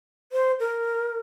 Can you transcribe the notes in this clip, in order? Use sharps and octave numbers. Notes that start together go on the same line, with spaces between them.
C5
A#4